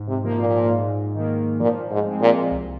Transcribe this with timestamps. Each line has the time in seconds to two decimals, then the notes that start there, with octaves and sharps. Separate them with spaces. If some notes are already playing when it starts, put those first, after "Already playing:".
Already playing: G#2
0.08 C3
0.24 F3 A#3
0.39 A#2
0.69 G#2
1.15 D#3 A#3
1.60 A#2 F3
1.91 G#2
2.05 G#3 C4
2.21 A#2
2.51 C2